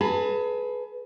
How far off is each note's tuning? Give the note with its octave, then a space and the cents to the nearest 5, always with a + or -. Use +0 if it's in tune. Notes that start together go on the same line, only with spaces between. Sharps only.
G#4 +35 B4 +0 A5 +40